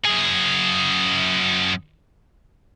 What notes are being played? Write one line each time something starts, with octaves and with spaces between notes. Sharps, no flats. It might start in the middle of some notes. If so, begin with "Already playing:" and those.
F#2 G#4